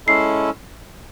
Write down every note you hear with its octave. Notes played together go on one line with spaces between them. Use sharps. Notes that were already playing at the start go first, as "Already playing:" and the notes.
G#3 C#4 E4 A4 C7